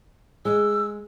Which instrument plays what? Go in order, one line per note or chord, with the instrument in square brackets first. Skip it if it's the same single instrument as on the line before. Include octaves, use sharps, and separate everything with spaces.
[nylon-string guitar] G#3 [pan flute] E6